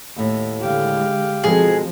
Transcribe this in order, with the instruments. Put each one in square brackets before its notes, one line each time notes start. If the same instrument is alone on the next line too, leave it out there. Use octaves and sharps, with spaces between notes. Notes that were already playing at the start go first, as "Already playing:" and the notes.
[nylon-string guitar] D#2 A2
[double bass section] D3 G#3 [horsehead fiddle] G4 F5
[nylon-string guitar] B2 G#3 A4 [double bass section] F3 C4 [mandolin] G#4